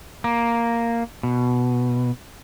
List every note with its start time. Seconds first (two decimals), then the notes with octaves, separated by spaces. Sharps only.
0.24 A#3
1.23 B2